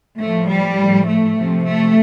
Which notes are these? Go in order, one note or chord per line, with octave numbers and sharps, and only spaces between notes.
A2 F3 A3
G3
A2 F3
A3
C3 F3
A3